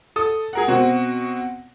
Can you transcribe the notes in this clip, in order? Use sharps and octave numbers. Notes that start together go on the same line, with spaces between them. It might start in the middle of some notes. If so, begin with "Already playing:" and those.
A4 D#6
G#4 A#4 F#5
B2 C4 F#4